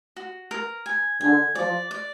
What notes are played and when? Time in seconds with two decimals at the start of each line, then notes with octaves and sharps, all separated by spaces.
0.16 F#4
0.51 A#4
0.86 G#5
1.20 D3 G#5
1.55 F3 D5
1.91 D5